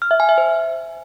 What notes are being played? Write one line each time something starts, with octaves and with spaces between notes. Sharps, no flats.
F6
E5
G#5
E5
C5